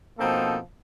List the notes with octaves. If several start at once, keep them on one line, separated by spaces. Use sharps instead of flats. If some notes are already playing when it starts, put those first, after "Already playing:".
B2 F3 A#3 C4 D#4 A4